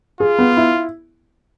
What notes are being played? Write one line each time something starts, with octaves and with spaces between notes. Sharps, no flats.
F4 G#4
B3
E4